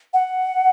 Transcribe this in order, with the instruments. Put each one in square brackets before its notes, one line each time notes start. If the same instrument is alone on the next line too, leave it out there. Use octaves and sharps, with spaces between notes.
[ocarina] F#5